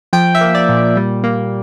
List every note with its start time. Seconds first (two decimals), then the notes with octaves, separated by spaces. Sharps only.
0.13 F3 G5
0.35 E5
0.41 A#3
0.55 D5
0.69 A#2
0.97 G3
1.24 A#3